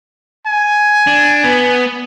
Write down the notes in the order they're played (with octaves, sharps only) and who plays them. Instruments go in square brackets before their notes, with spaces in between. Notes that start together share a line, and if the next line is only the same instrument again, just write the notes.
[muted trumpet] G#5
[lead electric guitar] D4
B3